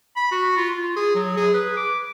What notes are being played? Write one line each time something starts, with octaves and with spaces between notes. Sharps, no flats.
B5
F#4
F4
F4
G#4
F#3
G#4
B4
D6